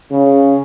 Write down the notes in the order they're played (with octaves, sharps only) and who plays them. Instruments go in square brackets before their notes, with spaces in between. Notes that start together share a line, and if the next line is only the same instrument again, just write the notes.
[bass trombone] C#3